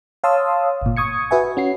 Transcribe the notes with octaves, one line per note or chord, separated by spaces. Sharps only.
C#5 F5 A5 C6 D#6 E6
G1 A#2
C#6 D#6 G#6 C#7
F#4 B4 E5 G#5
C#4 F#4 C7